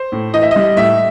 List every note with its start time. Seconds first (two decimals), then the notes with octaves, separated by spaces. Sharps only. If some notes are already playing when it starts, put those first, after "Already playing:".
Already playing: C5
0.12 A2
0.34 E3 D#5
0.42 E5
0.51 G3 D#5
0.77 A2 E5